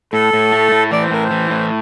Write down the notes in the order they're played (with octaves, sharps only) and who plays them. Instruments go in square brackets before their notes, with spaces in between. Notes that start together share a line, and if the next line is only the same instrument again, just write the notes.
[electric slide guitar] A2 [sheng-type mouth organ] A4
[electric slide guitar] A2
A3
A2
[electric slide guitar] E3 [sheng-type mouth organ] D5
[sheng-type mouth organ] C5
[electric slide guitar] A2 [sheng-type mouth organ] A#4
[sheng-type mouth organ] C5
[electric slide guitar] E3
A2